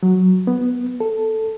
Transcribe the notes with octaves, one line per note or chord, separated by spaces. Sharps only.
F#3
B3
A4